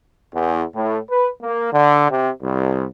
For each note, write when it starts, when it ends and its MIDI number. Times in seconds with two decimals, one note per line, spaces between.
0.33 0.63 40
0.75 0.98 45
1.10 1.29 71
1.42 1.70 58
1.73 2.08 50
2.10 2.30 48
2.43 2.86 36